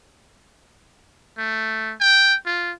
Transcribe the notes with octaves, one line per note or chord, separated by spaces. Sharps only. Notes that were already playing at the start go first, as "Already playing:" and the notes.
A3
G5
F4